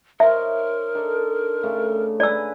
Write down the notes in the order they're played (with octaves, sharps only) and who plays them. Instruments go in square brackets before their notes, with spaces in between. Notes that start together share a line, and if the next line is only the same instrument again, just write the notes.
[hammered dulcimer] D#4 C5 C#5 [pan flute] A#4 [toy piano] E5
[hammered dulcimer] D4 D#4 A4
C#3 A3 D4
[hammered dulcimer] B4 G#5 A#5 [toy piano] D5 E6